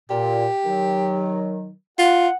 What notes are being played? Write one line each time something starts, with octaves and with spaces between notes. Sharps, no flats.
A#2 G4
D#3 F#3
F4 F#5